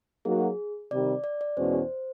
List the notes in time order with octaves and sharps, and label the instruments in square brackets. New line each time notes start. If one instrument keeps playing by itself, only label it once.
[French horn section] F#3 A#3 D#4 F#4 [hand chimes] G#4
[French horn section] C3 D#3 G3 [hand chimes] D5
[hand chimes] D5
D5
[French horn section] E2 B2 G#3 C#4 F#4 [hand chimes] C5